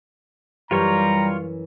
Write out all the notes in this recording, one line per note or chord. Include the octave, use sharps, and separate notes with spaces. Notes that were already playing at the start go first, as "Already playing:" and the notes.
F#2 E3 G3 F4 C#5 A#5